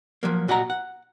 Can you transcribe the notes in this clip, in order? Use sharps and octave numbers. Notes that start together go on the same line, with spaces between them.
F3 F#3 A#3
A#2 F#4 D#5 F#5 A#5
F#5